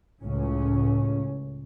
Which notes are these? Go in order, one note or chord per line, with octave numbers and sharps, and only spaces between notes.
C#2 A2 C#4